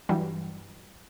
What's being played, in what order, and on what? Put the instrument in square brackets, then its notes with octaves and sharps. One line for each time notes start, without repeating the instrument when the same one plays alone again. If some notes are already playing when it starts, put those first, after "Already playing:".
[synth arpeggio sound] G2 E3 F#3 G3